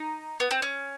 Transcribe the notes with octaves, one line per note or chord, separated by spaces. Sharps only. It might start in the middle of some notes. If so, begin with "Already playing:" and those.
Already playing: D#4
B3
C4
C#4